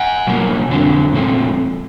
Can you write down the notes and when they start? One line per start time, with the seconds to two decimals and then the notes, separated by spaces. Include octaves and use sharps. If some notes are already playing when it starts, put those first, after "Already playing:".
Already playing: F#5 G#5
0.27 B2 F#3 A#3
0.70 F2 D3 F#3 A3 C4
1.13 A#2 F3 A3 C4